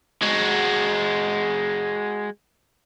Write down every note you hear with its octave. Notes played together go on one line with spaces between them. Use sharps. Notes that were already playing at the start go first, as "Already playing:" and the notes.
G#3 F#4